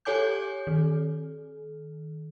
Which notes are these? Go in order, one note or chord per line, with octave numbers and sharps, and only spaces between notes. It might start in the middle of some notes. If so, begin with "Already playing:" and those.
G4 A4 C#5 G#5 D6 G6
D#3